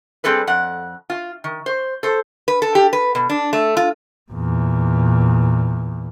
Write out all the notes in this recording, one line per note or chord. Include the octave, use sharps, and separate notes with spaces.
G3 C4 G#4 A4 B4
F2 F#5
F4
D#3
C5
A4 C5
B4
A4
G4
B4
B2
D4
A3
F4
E2 A#2